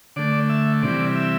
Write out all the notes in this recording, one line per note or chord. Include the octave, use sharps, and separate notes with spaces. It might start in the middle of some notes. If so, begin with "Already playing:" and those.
D3 A3 D5
E5
C3 E3 G3 D5
E5